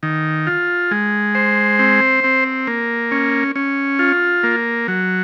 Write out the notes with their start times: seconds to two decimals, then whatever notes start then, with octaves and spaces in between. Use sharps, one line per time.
0.03 D#3
0.47 F4
0.91 G#3
1.35 C5
1.79 C4
2.24 C4
2.67 A#3
3.11 C#4
3.56 C#4
3.99 F4
4.43 A#3
4.88 F#3